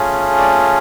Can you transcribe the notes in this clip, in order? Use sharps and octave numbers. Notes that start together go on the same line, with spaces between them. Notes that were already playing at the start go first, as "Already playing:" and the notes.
Already playing: A3 C#4 F4 G#4
D5